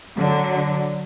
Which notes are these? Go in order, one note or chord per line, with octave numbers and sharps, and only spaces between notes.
D3 F#3